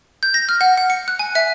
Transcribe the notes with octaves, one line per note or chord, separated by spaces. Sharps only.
G6
A#6
F6
F#5
F#5
C#7
F#6
G#5
E5